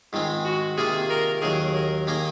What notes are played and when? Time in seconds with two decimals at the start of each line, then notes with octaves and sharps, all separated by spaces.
0.13 G#2 D#3 G#3 C4 F4
0.45 F#4
0.77 C3 D#3 A#3 F4 G#4
1.10 A#4
1.42 D#2 D#3 F#3 G#4
1.75 A#4
2.07 D#3 A#3 D#4 G#4 D#5